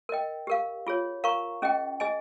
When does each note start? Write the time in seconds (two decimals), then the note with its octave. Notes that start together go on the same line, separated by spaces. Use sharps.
0.09 A#4 D#5 G5
0.47 G4 A#4 F5
0.87 F4 G#4 C#5
1.24 A#4 F5 A#5 C#6
1.62 C#4 G#4 D#5 G5
2.00 G#4 D#5 G#5